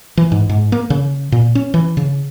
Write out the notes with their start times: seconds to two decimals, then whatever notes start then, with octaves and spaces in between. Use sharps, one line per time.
0.17 E3
0.32 G#2
0.49 G#2
0.72 A#3
0.90 C#3
1.32 A#2
1.55 C#4
1.74 E3
1.97 C#3